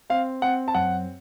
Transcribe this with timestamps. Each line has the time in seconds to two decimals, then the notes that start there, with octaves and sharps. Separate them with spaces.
0.10 C4 F5
0.42 C4 F#5
0.68 A5
0.75 F#2 F#5